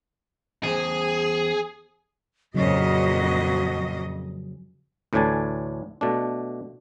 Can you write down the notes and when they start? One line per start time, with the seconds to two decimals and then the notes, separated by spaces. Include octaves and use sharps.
0.63 E2 G#4 C5 G#5
2.54 F2 A#2 C#3 F#3 C#4 F#4 D#5
5.13 D2 A2 E3 D4 G#5 A5
6.01 B2 A3 D4